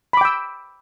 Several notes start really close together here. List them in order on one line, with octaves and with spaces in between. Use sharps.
B5 D6 G5 E6